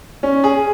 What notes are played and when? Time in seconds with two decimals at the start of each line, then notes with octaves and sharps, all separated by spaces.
0.23 C#4
0.44 G#4